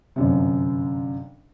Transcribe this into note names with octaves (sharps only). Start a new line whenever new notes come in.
G1 F#2 C3